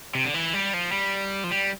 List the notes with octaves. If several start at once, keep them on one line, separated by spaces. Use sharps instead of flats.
C3
D3
E3
G3
F3
G3
F3
G3